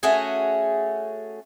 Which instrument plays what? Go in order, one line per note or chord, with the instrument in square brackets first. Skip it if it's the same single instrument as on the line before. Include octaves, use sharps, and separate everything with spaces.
[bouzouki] A3 C#4 F#4 G#4